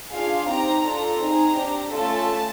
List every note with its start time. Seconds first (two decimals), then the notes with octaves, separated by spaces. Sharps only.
0.13 D4 F4 G#4 F5
0.49 C4 D#4 G4 A#5
0.85 D4 F4 A4 A#5
1.21 C4 D#4 G#4
1.56 D4 G4
1.93 A3 C#4 F4 A4 A5